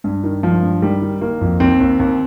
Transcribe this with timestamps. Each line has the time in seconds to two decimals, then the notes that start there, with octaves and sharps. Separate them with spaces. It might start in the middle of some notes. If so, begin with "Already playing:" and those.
0.04 G2
0.24 D#3
0.43 G2 F3
0.63 G2
0.82 D#3 G3
1.02 D#3
1.21 D#3 A#3
1.41 F2
1.60 D#2 C4
1.80 D#2
2.00 D#2